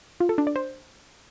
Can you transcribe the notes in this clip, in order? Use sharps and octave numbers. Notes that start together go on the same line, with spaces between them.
F4
A4
D4
D5
C5